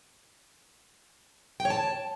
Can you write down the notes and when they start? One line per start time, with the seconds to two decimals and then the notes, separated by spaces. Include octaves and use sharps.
1.60 G5
1.65 C#5
1.70 A5